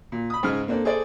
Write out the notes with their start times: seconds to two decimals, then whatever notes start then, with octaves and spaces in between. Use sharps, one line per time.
0.12 A#2
0.30 B5 D#6
0.43 G#2 C#3 G#3 G#4 F6
0.68 A#3 C4 D4 A4
0.85 G#4 A4 C5 D5